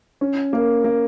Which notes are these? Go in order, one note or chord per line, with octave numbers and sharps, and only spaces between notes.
C#4
A#3
A#3